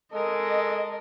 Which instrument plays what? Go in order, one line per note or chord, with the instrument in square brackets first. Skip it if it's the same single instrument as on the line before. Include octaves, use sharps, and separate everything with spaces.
[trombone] G#3 [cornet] A4 [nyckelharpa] A#4 [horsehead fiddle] D#5